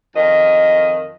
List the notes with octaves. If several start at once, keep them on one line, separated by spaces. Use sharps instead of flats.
F2 D#3 D#5